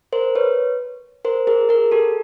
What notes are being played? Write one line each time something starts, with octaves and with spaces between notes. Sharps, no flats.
A#4 C5
B4 C#5
A#4 C5
G#4 A#4
G#4 A#4
G4 A4